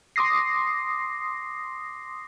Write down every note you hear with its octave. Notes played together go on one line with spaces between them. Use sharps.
C6 D6 D#6 A#6 C7